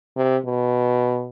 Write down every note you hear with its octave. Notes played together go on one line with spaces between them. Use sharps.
C3
B2